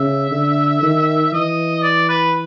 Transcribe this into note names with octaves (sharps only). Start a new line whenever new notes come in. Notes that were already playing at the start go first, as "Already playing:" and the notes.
Already playing: C#3 E5
D3
D#3
E3 D#5
D5
B4